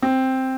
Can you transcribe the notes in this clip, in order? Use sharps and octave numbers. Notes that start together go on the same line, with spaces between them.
C4